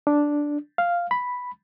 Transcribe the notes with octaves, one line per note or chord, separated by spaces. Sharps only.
D4
F5
B5